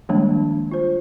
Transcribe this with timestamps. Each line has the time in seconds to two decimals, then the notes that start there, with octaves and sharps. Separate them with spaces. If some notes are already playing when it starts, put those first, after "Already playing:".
0.09 D#3 F3 G3 G#3 A#3 D4
0.71 F4 C5